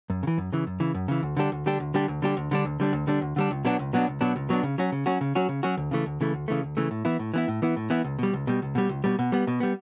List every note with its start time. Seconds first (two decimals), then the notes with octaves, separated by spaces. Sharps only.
0.10 F#2
0.23 C#3
0.27 E3
0.38 F#2
0.53 C#3 E3
0.67 F#2
0.80 C#3 E3
0.94 F#2
1.08 C#3 E3
1.23 D2
1.37 D3 G3 D4 G4
1.52 D2
1.66 D3 G3 D4 G4
1.80 D2
1.94 D3 G3 D4 G4
2.08 D2
2.22 D3 G3 D4 G4
2.37 D2
2.51 D3 G3 D4
2.65 D2
2.80 D3 G3 D4
2.93 D2
3.07 D3 G3 D4
3.21 D2
3.36 D3 G3 D4
3.51 C#2
3.65 B2 F#3 B3 D4
3.79 C#2
3.93 B2 F#3 B3 D4
4.07 C#2
4.21 B2 F#3 B3 D4
4.36 C#2
4.49 B2 F#3 B3 D4
4.63 C#3
4.78 F#3 C#4 F#4
4.92 C#3
5.06 F#3 C#4 F#4
5.21 C#3
5.35 F#3 C#4 F#4
5.49 C#3
5.63 F#3 C#4 F#4
5.77 D2
5.91 C#3 E3 A3
6.06 D2
6.21 C#3 E3 A3
6.34 D2
6.48 C#3 E3 A3
6.63 D2
6.77 C#3 E3 A3
6.91 A2
7.05 E3 B3 E4
7.19 A2
7.34 E3 B3 E4
7.48 A2
7.62 E3 B3 E4
7.76 A2
7.90 E3 B3 E4
8.04 C#2
8.19 B2 G3
8.33 C#2
8.47 B2 G3
8.62 C#2
8.75 B2 G3
8.89 C#2
9.04 B2 G3
9.19 B2
9.32 G3 B3
9.47 B2
9.60 G3 B3